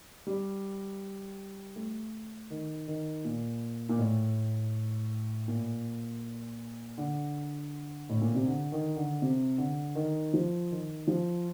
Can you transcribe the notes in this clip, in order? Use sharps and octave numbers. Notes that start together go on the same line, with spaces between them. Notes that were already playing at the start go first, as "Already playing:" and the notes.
G3
A3
D#3
D#3
A#2
A#2
A2
A#2
D3
A2
A#2
C3
D3
D#3
D3
C3
D3
D#3
F3
D#3
F3